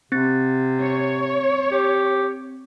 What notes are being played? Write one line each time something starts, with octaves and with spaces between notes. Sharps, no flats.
C3 C4 A6
C#5
G4